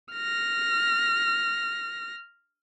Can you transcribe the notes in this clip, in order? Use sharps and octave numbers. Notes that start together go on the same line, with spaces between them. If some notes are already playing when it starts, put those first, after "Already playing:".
F6 A#6